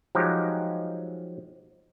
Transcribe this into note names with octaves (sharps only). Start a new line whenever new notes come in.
F3 F#3 G#3 D#4 G4